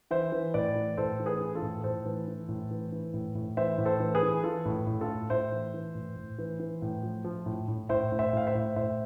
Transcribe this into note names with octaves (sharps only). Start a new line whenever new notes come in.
E3 C5 E5
E3
A2 B4 D5
E3
A2 A4 C5
E3
G#4 B4
E3
F4 A4
A2
A2 A4 C5
E3
E3
A2
E3
E3
A2
A2
E3 C5 E5
A2
A4 C5
E3
G#4 B4
E3
E3 F4 A4
A2
A2
F4 A4
A2
A2 C5 E5
E3
E3
A2
A2
E3
E3
A2
F3
F3
A2
A2
A2 C5 E5
A2
C5 E5
A2 F5
C5 E5
A2
A2 C5 E5